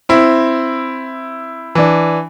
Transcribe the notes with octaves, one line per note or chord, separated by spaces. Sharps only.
C4 E4
E3 D4